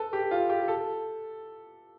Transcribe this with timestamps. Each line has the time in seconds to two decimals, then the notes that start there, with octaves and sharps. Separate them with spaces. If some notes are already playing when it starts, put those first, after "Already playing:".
Already playing: A4 B4
0.13 G4
0.31 F4
0.49 G4
0.68 A4